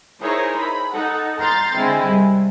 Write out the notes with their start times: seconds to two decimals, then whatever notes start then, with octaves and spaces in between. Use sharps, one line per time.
0.21 D#4 E4 G#4 A#4 C5 C#5
0.58 B5
0.94 D#4 A4 F#5
1.39 A#5 C6 F6 G6 A6 C7
1.74 D3 G#3 C4 E4
2.05 C2